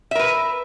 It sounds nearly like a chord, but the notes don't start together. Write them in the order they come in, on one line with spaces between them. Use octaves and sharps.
E5 A#4 B4